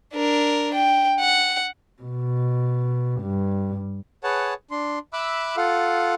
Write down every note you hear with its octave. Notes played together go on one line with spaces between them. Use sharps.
D4 A#4
G5
F#5
B2
G2
G#4 B4 C#5 F#5 A5
D4 C6
E5 B5 D6 E6 F#6
F4 A4 F5 F#5